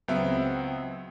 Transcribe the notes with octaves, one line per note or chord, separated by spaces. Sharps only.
C#2 F#3 B3 C4 E5